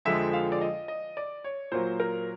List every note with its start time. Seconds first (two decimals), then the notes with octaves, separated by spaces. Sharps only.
0.05 F2 D3 F3 G#3 E5
0.33 F5
0.52 D5
0.61 D#5
0.88 D#5
1.17 D5
1.44 C#5
1.72 A#2 F#3 A#3 C5
2.00 A#4